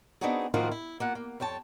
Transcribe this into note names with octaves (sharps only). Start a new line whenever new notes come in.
B3 C4 D4 D#4 F#4 G#4
A2 D#3 F3 A#3 F4 F#4
E4
A#3 F4 F#5
A#3
F2 C#5 G5 A5